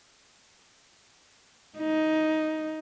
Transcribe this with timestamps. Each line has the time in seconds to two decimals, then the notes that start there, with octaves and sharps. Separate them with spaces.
1.79 D#4